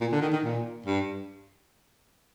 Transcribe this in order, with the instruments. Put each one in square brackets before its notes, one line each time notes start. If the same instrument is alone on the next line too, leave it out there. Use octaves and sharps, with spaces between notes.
[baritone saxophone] A#2
D3
D#3
D#3
A#2
G2